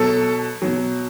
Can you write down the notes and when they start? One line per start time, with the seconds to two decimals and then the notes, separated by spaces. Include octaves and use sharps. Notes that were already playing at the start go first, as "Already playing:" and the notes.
Already playing: B2 F#3 A4
0.62 B2 F#3